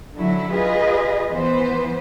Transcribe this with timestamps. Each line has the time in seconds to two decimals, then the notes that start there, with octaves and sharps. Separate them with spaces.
0.16 D3 F#3 E4
0.52 F4 G#4 B4 D#5
1.31 E3 B3 B4 C5